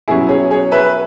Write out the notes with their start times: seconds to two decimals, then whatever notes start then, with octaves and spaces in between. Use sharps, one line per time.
0.08 B2 F#3 C#4 E4 G#4
0.29 G#4 C#5
0.50 G#4 C#5
0.71 B4 E5